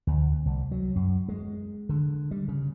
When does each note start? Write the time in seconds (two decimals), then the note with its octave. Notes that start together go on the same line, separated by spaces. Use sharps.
0.07 D2
0.46 C2
0.71 F#3
0.96 F#2
1.29 G#3
1.89 D3
2.31 G3
2.48 C#3